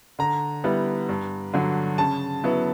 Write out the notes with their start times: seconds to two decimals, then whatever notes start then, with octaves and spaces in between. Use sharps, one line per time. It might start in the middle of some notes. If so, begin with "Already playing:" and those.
0.19 D3 A#5
0.64 G3 B3 E4
1.09 G2
1.54 D3 F#3
1.98 C#3 A5
2.44 F#3 B3 E4